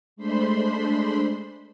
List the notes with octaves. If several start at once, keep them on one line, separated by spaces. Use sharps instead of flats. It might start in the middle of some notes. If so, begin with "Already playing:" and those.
G#3 A3 D4 C5 B5 C6